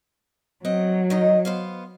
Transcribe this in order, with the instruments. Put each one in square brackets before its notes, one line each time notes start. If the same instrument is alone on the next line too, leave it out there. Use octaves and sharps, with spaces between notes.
[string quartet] F#3 [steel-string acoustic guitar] C4 D#5 F#5
[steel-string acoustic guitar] D#3 D#4 D#5
B3 C5 F5